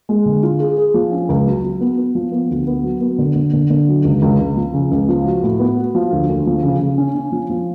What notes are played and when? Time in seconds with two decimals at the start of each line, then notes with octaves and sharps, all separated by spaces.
0.09 G#3
0.26 D3
0.43 F4
0.60 G#4
0.77 G#4
0.94 F3
1.12 C#4
1.29 C#2
1.46 F#3
1.63 F#3
1.81 B3
1.98 B3
2.15 F3
2.32 B3
2.50 D2
2.67 B3
2.84 F#3
3.01 B3
3.18 D3
3.35 D3
3.53 D3
3.70 D3
3.88 F#3
4.04 C#2
4.22 C#2
4.39 C#2
4.57 F3
4.74 C#3
4.91 C#2
5.08 F3
5.26 F#4
5.43 A2
5.59 B3
5.77 F#4
5.95 F3
6.12 D2
6.29 D2
6.47 F3
6.63 C#3
6.80 C#3
6.98 C#4
7.15 C#4
7.32 F3
7.50 F3